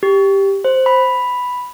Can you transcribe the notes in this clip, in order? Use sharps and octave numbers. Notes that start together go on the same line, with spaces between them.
G4
C5
B5